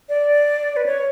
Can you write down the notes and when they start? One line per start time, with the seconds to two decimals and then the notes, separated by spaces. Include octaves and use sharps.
0.09 D5
0.76 B4
0.86 C#5